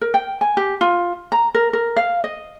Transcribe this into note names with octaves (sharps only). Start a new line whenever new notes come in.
A#4
G5
G#5
G4
F4
A#5
A#4
A#4
F5
D#5